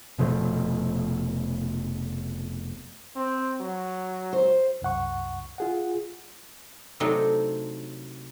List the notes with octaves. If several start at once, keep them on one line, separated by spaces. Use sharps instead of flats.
F1 B2 F3 A3
C4
F#3
C5
C2 F#2 F#5 C#6
F4 G#4 F#5
C3 F#3 A3 C4 D4 D#4